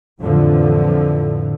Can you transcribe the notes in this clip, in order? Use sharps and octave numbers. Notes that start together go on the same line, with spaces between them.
F2 A2 D3 E3 F3